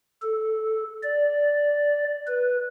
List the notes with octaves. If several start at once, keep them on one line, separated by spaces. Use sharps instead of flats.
A4
D5
B4